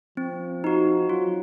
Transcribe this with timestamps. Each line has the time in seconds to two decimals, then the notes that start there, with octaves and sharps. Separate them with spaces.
0.17 F3 C4
0.64 D#4 F#4
1.09 F#3 F4